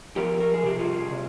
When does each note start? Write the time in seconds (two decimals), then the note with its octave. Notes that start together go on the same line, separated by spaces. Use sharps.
0.16 F3 G4 A#4
0.40 A#4
0.54 G#4
0.63 C3 G4
0.79 F4 G#4
1.11 C3